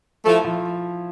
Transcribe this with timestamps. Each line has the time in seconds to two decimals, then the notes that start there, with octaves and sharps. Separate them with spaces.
0.25 F3 A3 E4
0.45 F3